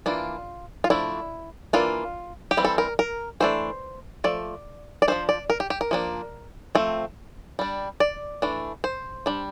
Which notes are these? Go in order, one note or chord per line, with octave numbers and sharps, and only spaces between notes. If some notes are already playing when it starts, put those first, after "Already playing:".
E3 A#3 D4 F4
F4
F3 A3 D4 E4
E3 A#3 D4 F4
G4
E3 G3 C4
A4
A#4
A#4
E3 A3 D4 C5
F3 A3 D5
D5
F3 A3 D4 C5
D5
A#4
G4
G4
A#4
F3 A#3 D4
F3 A3 C4
G3 D4
D5
E3 A3 D4
C5
G3 D4